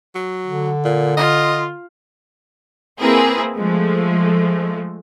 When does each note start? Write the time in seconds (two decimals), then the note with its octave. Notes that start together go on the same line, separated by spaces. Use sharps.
0.15 F#3
0.47 D3
0.85 A#2
1.17 F4 D#5
3.00 A#3 C4 E4 G#4 A#4 B4
3.57 F3 G#3 A3